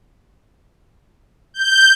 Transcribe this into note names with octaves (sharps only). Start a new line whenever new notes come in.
G6